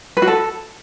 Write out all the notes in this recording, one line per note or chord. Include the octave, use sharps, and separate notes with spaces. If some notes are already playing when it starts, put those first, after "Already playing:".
B4
F#4
A4